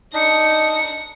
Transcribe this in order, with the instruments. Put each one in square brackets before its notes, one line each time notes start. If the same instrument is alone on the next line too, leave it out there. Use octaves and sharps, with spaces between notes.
[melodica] D4 D#4 [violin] A#6 C#7